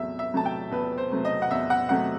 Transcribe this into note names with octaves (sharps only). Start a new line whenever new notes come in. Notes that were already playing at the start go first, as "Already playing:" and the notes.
Already playing: E2 C3 F#3 A3 E5
E5
C3 F#3 A3 A5
G5
E2 B4
C5
C3 F#3 A3
D#5
F#5
E2 E5
F#5
C3 F#3 A3 F#5